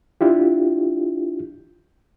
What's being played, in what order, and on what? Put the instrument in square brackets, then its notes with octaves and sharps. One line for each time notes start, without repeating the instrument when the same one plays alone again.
[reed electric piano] D4 E4 F4 G4